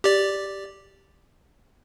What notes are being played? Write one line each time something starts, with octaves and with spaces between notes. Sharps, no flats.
G4 D5